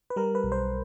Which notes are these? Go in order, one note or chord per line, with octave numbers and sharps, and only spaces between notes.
B4
G3 A#4
B4
B1
C5